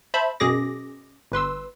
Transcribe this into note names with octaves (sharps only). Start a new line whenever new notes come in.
C5 E5 A5 B5
F#2 B2 C#4 G#4 D6 A#6
G1 B4 C6 E6